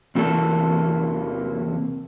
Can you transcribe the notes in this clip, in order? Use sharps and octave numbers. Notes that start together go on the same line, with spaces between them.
E2 C3 E3 A#3 A4